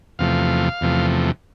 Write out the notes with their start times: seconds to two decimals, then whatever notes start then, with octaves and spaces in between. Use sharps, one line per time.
0.19 E2 C3 F3 A3 F5
0.81 E2 C3 F3 A3